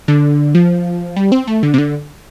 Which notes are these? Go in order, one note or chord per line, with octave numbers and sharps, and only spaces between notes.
D3
F3
G3
C4
A3
D3
C3
D3